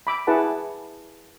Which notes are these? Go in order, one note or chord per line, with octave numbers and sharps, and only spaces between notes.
B5 D6 E6
E4 G#4 B4 F#5 A5